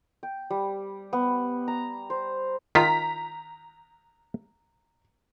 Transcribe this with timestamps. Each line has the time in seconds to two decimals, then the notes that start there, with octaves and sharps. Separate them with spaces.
0.23 G5
0.50 G3
1.13 B3
1.68 A#5
2.10 C5
2.75 D#3 F4 A#5 B6